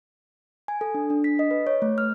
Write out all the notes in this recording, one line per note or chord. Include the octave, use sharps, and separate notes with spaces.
G#5
A4
D4
D4
B6
D#5
B4
C#5
A3
F6